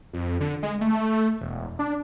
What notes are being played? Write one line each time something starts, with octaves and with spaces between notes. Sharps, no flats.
F2
D3
G#3
A3
E1
D4